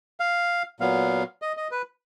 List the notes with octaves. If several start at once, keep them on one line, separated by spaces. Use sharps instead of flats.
F5
A#2 F#3 B3 F5
D#5
D#5
B4